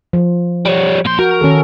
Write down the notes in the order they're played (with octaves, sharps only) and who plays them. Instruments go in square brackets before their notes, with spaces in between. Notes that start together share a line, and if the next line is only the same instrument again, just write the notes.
[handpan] F3
[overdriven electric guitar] G3 C#5
[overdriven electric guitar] A#2 C6 [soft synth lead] G6
[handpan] F#4 [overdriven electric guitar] A#4
[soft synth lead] D#3 [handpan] C#4 A4